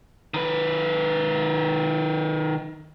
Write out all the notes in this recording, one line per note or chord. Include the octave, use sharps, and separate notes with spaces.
D#3 B4